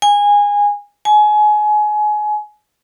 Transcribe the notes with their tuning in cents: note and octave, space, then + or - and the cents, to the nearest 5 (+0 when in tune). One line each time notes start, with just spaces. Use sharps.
G#5 -20
G#5 +25